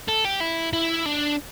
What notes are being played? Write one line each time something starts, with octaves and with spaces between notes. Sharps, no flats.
A4
G4
E4
E4
D4